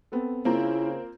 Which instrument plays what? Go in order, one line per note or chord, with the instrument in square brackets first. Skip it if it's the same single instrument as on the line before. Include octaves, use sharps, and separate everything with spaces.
[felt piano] B3 C4 A4
[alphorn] C#3 [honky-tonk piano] A#3 C4 [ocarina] E4 [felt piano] F4 A#5